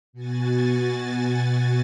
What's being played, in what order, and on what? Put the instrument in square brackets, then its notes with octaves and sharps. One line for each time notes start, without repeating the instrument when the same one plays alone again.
[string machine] B2 F#4 G#5 A6